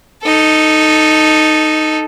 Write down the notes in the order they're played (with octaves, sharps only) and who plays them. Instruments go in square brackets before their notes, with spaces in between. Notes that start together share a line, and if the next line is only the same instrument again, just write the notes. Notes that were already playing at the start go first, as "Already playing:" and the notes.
[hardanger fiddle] D#4 A4